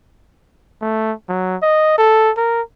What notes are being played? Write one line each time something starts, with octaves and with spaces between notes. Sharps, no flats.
A3
F#3
D#5
A4
A#4